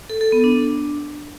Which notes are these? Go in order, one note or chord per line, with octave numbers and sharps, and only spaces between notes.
A4
A4
B3
D4